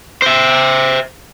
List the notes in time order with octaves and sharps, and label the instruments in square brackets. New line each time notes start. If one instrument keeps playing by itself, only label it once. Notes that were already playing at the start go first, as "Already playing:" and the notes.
[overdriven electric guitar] C5 E5